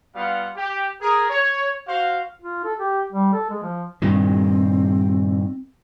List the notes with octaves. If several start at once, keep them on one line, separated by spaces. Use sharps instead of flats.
G3 B3 F4 F5 F#5
G4
G#4 A#4
C#5
F#4 C5 F5
F4
A4
G4
G3
A4
G#3
F3
G2 A#2 D#3 C4